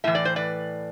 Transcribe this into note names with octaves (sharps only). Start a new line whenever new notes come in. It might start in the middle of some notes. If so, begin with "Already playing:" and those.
A2 E3 E5
D5
C5
B4 D5